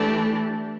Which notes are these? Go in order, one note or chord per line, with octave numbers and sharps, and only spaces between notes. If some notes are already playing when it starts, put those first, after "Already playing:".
Already playing: E3 A3 D4 G4